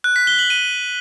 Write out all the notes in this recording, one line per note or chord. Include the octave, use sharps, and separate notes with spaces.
F#6
B6
G7
F#7
D#7